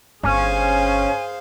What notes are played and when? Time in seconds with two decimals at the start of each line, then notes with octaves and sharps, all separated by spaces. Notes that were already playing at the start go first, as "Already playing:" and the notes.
0.23 G1 C#4 G#4 C5 F5 G#5